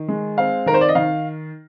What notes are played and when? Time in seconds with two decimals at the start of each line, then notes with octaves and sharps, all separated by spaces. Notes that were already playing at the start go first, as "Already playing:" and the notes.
Already playing: D#3
0.08 G#3
0.38 C4 F5
0.66 D#3 A#4
0.74 C5
0.81 D5
0.89 D#5
0.95 D#3 F5